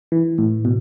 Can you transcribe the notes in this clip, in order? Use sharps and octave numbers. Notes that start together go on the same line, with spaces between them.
E3
A2
B2